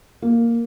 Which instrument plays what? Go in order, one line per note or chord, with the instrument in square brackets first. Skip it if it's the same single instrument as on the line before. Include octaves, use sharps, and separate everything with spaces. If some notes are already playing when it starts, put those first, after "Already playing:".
[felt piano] A#3